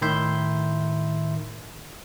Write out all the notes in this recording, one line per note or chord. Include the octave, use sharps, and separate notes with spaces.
A2 D#3 E4 E5 C6 G6